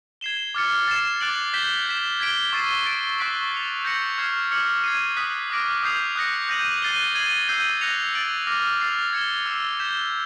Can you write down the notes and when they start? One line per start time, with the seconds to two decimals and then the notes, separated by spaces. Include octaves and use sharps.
0.21 G#6 C7 E7 G7
0.54 D6 F6 A6 C#7
0.88 A6 C7 E7
1.21 D6 F#6 A6 D7 F#7
1.54 G6 B6 E7 G7
1.86 G6 B6 E7
2.20 G#6 B6 D7 G7
2.53 C#6 E6 A6 C7 D#7
2.86 A6 D7 G7
3.18 C#6 F#6 B6 D7 F#7
3.52 A6 C#7 F7
3.85 G6 A#6 C#7 F#7
4.18 C#6 F6 G#6 C7
4.51 D6 F6 G#6 C#7 F#7
4.84 G#6 C7 D#7
5.17 D#6 F#6 B6
5.50 D6 F6 A#6 D7
5.83 D#6 G6 C7 F7
6.16 D#6 F#6 A#6 C#7
6.49 G6 A#6 D#7 F#7
6.82 F#6 A6 C7 D#7 G7
7.15 G#6 C7 D#7 F#7
7.48 E6 G6 C7 D#7 F#7
7.81 F#6 A#6 C#7 F7
8.14 A6 D7 F#7
8.47 D6 F6 A#6
8.80 F6 A6 C7 F7
9.13 G#6 C#7 E7 G7
9.46 E6 A6 C7 E7
9.79 G6 B6 E7 G7